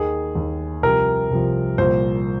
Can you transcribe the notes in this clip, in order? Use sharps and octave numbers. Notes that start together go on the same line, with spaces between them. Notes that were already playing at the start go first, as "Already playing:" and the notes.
Already playing: D#2 D#3 G#4
D#2 D#3
C2 C3 F3 A#4
C2 C3 F3
C2 A#2 F3 C5